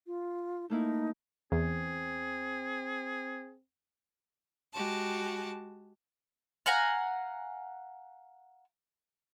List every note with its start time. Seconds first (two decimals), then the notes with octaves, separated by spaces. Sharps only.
0.07 F4
0.70 A3 A#3 D#4 E4
1.52 E2 C4 G#4
4.73 G#3 F#4 G4 A5
6.66 F5 F#5 G#5 A#5